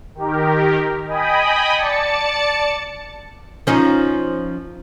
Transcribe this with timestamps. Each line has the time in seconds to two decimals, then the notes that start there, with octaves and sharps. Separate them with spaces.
0.15 D#3 G4 A#4
1.07 D#5 G5 G#5 B5 D#6
1.76 D5 A5 A6 C#7
3.67 F3 C#4 D#4